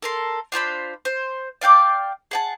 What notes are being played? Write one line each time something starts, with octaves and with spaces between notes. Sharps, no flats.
A4 A#4 C6
D4 F4 C5 B5
C5
D5 F5 G5 D6
G#4 F#5 A5